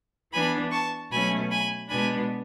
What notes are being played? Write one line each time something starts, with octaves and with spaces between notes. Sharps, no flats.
E3 B3 D4 G#5 B5
A5 C#6
B2 F#3 A3 C#4 G#5 B5
G#5 B5
B2 G#3 B3 D4 G#5 B5